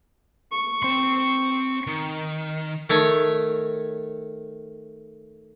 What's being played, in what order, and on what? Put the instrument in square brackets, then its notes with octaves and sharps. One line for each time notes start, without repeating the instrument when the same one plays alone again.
[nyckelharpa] C#6
[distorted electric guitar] C4 C6
D#3
[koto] D#3 A3 C#5